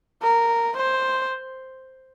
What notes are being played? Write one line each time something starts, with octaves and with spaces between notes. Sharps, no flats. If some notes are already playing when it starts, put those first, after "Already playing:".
A#4
C5